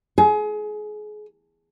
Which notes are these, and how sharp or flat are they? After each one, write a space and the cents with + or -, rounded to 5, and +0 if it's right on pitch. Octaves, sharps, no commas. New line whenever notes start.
G#4 +30